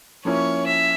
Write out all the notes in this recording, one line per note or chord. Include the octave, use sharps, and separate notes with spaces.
F3 A#3 C#4 E4 C#5
E5